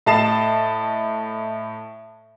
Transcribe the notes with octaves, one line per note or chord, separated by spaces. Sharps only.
A2 D#5 A5 C7 E7